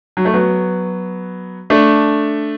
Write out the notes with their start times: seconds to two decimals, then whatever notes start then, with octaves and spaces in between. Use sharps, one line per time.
0.17 F#3
0.25 A3
0.34 F#3 B3
1.70 A3 D4